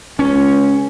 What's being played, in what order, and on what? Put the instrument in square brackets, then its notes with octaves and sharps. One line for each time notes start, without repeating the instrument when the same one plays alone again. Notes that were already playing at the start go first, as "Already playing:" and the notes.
[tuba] C#2 [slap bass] C#4